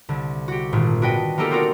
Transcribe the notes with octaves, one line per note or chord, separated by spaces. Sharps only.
C2 D3
F#4 G4
G#1 A#2
D4 F#4 B4 D#5 G5
A#3 B3 D#4 G4 A4 A#4
C4 D#4 F4 F#4 A#4 D5